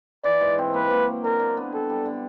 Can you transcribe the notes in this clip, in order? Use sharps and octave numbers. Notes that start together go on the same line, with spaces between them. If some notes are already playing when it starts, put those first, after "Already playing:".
E3 D5
G#2
C4
A#3 B4
A#3
F#3
D3 A#4
D3
B3
G3 A4
G3
D3